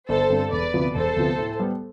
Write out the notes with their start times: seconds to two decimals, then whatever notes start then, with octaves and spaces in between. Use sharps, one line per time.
0.09 G1 A4 C5
0.30 G2 D3 G3 C4
0.51 E1 B4 D5
0.74 D2 C3 F3 B3
0.95 E1 A4 C5
1.16 D2 C3 F3 B3
1.38 A2
1.59 G3 B3